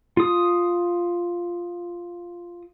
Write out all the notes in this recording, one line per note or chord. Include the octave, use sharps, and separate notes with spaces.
F4 D#6